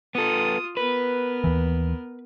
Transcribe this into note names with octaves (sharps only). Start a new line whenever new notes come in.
B3 F4 A4 D#6
B3 A#4 B4
D#2 E3